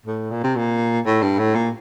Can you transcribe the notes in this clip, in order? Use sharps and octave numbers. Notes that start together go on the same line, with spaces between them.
A2
A#2
C3
A#2
A2
G2
A2
A#2